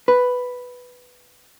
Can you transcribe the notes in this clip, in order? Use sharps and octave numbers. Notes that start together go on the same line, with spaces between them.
B4